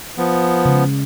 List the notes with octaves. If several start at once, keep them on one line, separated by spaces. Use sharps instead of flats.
F3 B3
C#3 G#3